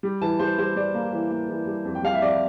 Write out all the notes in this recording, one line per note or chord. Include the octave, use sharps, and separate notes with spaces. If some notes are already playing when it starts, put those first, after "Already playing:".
G3
E3 A5
G3 C5
G3 C5
G3 D5
A#3
E3
A#3
E3
G3
F2
G5
G3 F5
E5
F2 D5